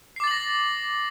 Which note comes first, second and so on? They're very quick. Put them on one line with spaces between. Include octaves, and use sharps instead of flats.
C7 D6 A6 F#7 A#6